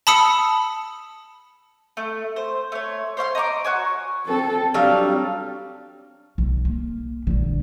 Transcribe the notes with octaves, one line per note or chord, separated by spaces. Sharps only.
A5 B5 D#6 E6 C#7
A3
C5
A3 C#5
C5 C#5 E5 C6
D#5 A#5 C#6 D6
F#4 C#5 G#5
C4 A4
F#3 G3 C4 D4 F5
B1
A#3
A#1 D3